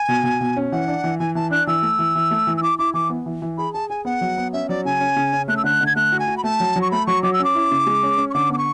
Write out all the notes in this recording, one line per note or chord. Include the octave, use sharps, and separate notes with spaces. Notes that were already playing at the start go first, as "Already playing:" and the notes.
Already playing: G#5
B2
B2
B2
C#4
E3 F#5
D4
E3
E3 G#5
E3 A5
D4 F#6
E3 E6
A3
E3
E3
A3
E3
E6
E4 D6
E4 D6
E3 D6
B3
E3
E3
G#4 B5
G#4 A5
G#4 G#5
B3 F#5
F#3
B3
C#4 E5
F#3 D5
C#3 G#5
C#4
C#3
C#4
A3 F#6
E6
D3 F#6
D3
G#6
A3 F#6
F#4
G#5
F#4
B5
A3 A5
F#3
F#3
C#6
A3 B5
F#3 C#6
F#3 D6
E6
C#4 D6
E4
C#3
G#3
C#4
C#4
C#6
D3 D6
B3 D6
C#6